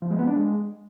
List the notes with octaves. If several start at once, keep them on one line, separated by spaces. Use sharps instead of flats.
F3
G#3
B3
D4
G#3